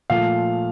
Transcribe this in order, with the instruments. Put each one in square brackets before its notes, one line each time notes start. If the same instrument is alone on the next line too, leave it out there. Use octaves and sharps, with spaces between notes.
[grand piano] A#2 F3 A3 F5